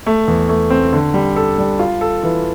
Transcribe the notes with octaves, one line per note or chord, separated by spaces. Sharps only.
A3
E2
A3
C4
D3
G3
A4
G3
F4
A4
E3